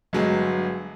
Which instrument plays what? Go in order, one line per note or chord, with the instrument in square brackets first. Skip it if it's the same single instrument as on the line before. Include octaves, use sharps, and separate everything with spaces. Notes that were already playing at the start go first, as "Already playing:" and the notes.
[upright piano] G1 F#3 G#3